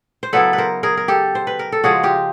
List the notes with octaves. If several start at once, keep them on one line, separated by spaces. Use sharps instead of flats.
C5
C#3 F#3 B3 E4 A4 B4
B4
A#4 C5
G#4 A#4
A#4
G4 A4
C5
B4
A#4
A4
C#3 F3 G#3 F#4 G#4
F4 G4